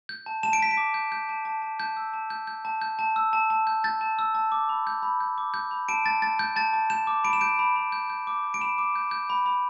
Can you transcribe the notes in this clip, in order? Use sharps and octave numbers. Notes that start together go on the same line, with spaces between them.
G6
A5
A5 E7
D7
A5 B6
D7
D6
G6
G6
A5
A5
A5
A5 G6
E6
A5
G6
G6
A5
G6
A5
E6
A5
A5
G6
G6 A6
A5
E6
A5
D6
B5
G6
B5
G6
D6
G6
B5
A5 D7
A5 A6
A5 A6
A5 G6
A5 A6
A5
G6 E7
D6
B5 D7
E7
G6 D7
B5
B5
G6
G6
D6
G6
D7
B5 E7
D6
G6
G6
B5
B5